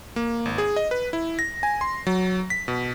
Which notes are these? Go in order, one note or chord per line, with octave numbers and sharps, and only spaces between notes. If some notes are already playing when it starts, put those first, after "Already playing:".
A#3
G#1
G#4
D#5
B4
E4
A#6
G#5
C6
F#3
B6
B2